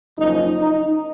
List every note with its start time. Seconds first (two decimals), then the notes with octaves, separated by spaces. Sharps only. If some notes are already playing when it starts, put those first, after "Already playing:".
0.16 F#1 F#2 F3 D#4
0.59 D#4